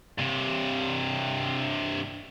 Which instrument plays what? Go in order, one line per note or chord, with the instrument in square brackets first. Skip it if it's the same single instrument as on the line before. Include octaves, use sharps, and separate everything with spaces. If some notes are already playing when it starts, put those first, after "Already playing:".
[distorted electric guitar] G2 C3